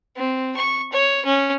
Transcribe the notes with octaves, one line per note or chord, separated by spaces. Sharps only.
C4
C#6
C#5
C#4